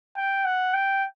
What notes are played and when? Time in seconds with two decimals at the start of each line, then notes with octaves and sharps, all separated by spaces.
0.17 G5
0.45 F#5
0.74 G5